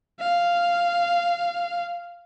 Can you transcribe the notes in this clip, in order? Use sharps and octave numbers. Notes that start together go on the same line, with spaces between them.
F5